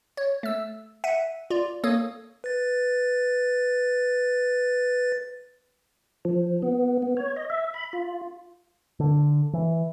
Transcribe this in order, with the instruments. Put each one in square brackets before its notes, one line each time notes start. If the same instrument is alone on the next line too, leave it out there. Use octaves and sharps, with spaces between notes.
[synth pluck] C#5
A3 E6
E5 F#5 D#7
F4 D5
A#3 A4 C#5 D#6
[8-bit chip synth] B4 A6
[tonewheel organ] F3
B3
B3
C#5
D#5
E5
B5
F4
[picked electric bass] D3
E3